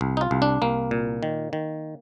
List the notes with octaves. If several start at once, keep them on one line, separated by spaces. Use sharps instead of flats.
C2
D#4
F4
C2
D4
C2 A#3
A#2
D#3
D#3